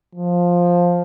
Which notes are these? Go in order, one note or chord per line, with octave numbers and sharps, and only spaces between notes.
F3